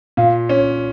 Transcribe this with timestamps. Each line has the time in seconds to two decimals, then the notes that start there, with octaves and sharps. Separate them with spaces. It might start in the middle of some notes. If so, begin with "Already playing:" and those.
0.17 A#2 F5
0.49 C#4 C#5